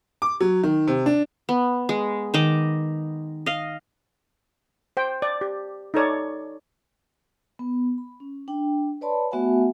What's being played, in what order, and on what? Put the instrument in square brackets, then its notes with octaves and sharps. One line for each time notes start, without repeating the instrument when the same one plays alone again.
[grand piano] D6
F#3
D#3
C3
D4
[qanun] B3
G#3
D#3 D#5 D6
D#5 F5
[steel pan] C5 G5
D5
G4
D#4 A4 C#5 D5
[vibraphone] B3
B5
C#4
D4 G5
B4 C#5 D5 A5 B5 C6
A3 B3 F#4 E5 F#5 G#5